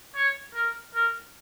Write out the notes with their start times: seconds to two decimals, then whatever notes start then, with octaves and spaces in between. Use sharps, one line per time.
0.15 C#5
0.54 A#4
0.95 A#4